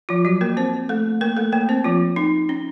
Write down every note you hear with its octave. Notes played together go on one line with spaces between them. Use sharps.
F3 F4
F#3 F#4
A#3 A#4
C4 C5
A3 A4
A#3 A#4
A3 A4
A#3 A#4
C4 C5
F3 F4
D#4
C#4